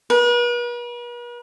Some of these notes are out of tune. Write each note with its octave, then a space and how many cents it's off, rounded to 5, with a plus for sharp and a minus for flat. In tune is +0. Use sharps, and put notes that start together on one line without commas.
B4 -45